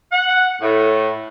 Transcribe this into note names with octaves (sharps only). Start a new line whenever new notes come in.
F#5
A2